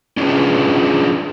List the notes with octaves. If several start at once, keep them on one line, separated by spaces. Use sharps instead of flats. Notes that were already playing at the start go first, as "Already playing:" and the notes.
C#4 D4 F4 G#4 B4